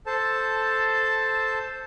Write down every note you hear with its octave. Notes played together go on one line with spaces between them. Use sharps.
A4 C5 A5